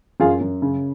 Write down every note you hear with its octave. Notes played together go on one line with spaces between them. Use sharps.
F#2 F4 G#4
F#2
C#3